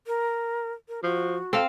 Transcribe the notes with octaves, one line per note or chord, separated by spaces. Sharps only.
A#4
A#4
F3 F#4
C4 A4 F5